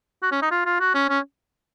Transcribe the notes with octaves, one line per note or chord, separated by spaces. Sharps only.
F#4
C#4
D#4
F4
F4
F#4
C#4
C#4